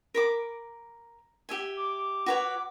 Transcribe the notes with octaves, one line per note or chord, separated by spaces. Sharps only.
A#4 B5 D6
G4 E5 G#5
D6
F#4 B4 C#5